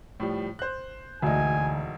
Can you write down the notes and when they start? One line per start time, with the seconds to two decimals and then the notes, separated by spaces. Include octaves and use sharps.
0.20 A2 F3 G3
0.59 C5 F#6
1.22 E1 D2 D#4 G#5